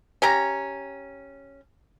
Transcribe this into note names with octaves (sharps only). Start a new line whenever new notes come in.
C#4 G4 A#5